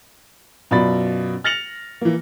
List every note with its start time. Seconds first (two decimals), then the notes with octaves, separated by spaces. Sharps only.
0.71 F#2 B2 F4 D5 B5 A6
1.44 F6 A6 A#6 C#7 F7 F#7
2.01 E3 A#3